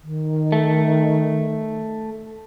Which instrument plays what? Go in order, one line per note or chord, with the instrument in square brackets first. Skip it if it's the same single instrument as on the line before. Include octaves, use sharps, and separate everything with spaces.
[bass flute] D#3
[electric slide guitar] A3